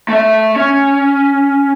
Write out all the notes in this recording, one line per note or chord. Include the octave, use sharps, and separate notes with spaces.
A3 E5
C#4